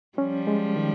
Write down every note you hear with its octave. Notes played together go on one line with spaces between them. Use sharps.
F3 G3 C#4
G#3
D#3